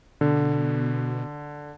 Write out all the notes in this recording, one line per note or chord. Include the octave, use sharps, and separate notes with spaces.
B2 D3